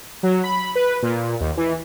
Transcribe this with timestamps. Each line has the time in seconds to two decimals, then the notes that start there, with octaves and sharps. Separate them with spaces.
0.23 F#3
0.44 B5
0.75 B4
1.03 A#2
1.40 D#2
1.57 E3